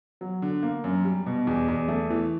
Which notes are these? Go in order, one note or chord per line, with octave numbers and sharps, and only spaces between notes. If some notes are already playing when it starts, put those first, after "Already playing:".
F#3
D3
A#3
F#2
G3
B2
E2
E2
A3
E3